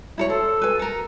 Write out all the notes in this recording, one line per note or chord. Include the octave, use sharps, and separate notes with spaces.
E4 A4 C#5
A4 C5
B4 G#5
A4 A#4